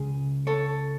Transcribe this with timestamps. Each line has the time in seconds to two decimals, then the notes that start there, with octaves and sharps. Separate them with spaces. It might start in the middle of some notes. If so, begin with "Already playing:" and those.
Already playing: C#2 C#3 G#4
0.47 A4 C#5